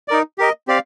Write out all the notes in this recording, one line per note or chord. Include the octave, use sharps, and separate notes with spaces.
D#4 A#4 D5
G4 A#4 D#5
C4 G4 D5 F5